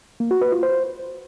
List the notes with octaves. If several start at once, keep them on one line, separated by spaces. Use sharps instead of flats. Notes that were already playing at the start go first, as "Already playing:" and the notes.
A#3
F#4
B4
F4
C5